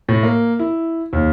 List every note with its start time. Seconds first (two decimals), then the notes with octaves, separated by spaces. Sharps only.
0.09 A2
0.23 A#3
0.59 E4
1.13 D#2